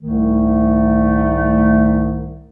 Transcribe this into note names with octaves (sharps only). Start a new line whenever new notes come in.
C2 G#2 D#3 A3